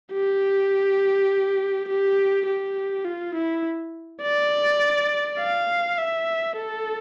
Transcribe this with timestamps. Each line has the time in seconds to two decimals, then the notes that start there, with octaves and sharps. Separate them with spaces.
0.13 G4
1.88 G4
2.47 G4
3.05 F4
3.35 E4
4.22 D5
5.40 F5
5.98 E5
6.56 A4